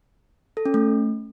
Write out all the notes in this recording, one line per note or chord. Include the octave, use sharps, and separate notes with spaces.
A4
C#4
A3